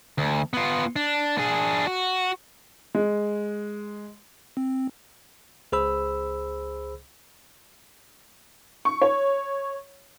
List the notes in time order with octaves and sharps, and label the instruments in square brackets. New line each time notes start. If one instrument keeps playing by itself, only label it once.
[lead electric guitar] D2
B3 F4
D4
D4 G#4
F#4
[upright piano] G#3
[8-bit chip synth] C4
[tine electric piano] C#2 G#4 C5 B5 E6
[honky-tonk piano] C#6
C#5